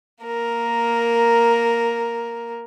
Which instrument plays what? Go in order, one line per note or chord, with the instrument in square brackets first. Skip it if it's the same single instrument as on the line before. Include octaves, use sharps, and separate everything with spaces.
[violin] A#3 A#4